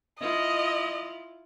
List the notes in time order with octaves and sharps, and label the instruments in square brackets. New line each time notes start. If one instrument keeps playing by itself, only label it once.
[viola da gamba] E4 F4 [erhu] D#5